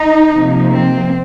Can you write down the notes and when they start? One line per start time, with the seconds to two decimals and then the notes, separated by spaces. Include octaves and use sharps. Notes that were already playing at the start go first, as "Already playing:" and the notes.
Already playing: D#4
0.33 C3 F3 A#3
0.74 C4